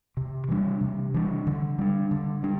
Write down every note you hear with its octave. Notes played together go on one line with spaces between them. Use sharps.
C3
E3 G3 D4
C3
E3 G3 D4
D3
G3 D4
D3
G3 D4